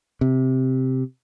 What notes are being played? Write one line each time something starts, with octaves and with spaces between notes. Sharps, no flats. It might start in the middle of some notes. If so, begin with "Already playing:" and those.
C3